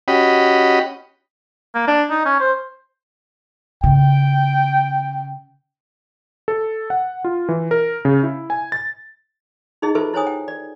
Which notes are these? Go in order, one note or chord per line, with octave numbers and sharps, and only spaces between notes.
C#4 F#4 G4 D#5 B5
A#3
D4
D#4
C#4
C5
C#3 G5
A4
F#5
F4
E3
A#4
C#3
E4
G#5
A6
D#4 E4 G#4 D#5
F4 G4 A4 B4 C5 E5
E4 C5 C#5 G#5 D#6
G5
D5